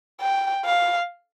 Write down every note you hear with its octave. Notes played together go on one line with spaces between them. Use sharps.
G5
F5